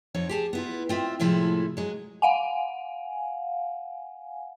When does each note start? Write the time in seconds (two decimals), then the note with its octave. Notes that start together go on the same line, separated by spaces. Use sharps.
0.14 F2 F3 D#4 C#5
0.29 G4 G#4 A5
0.53 B3 E4 F4
0.89 C4 F4 D#5 E5
1.20 A2 C3 F3 G#3 E4 A4
1.77 F#3 G#3
2.22 F5 F#5 G#5